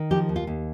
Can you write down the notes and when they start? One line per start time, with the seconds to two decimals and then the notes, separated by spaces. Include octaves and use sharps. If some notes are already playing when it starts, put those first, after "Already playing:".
Already playing: D#3
0.11 F3 G4
0.29 D#2
0.36 F4
0.47 D#2